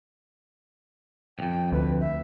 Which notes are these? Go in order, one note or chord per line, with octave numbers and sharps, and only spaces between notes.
C2 F2 G5
D2 B4
E5